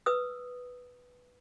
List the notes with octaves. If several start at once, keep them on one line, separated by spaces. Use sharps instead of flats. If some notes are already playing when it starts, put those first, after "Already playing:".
B4 D#6 E6